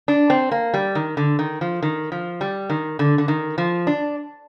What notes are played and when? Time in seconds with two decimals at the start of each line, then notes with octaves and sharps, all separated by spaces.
0.08 D4
0.30 C4
0.51 A#3
0.74 G3
0.95 D#3
1.17 D3
1.39 D#3
1.61 F3
1.83 D#3
2.12 F3
2.41 G3
2.70 D#3
2.99 D3
3.18 D3
3.28 D#3
3.58 F3
3.87 D4